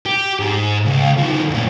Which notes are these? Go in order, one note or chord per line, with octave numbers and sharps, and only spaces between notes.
G4
G#2
C#2
D#3 F3
F#2 A#2